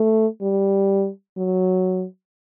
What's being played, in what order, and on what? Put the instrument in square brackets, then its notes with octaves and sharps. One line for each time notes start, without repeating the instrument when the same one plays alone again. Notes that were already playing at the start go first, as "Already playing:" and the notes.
Already playing: [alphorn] A3
G3
F#3